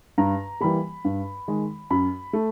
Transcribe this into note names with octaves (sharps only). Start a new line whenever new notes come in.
G2 A#5
E3 G3 A#3 B5
G2
D#3 G#3
F#2 B5
A3